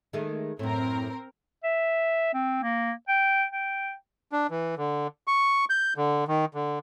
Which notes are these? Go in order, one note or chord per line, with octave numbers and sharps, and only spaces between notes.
D#3 G#3 A3
F#2 A2 C4 A#4
E5
C4
A#3
G5
G5
D4
E3
D3
C#6
G6
D3
D#3
D3